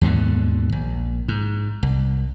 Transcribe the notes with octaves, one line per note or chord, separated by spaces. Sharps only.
D#2 G#2 B2 D3
A#1
G#2
C2